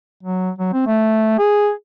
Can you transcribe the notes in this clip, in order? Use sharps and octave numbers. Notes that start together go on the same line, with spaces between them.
F#3
F#3
C4
A3
G#4